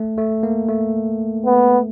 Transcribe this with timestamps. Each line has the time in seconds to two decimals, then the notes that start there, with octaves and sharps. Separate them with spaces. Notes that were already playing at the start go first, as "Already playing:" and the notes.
Already playing: A3
0.18 A3
0.43 A#3
0.69 A3
1.45 B3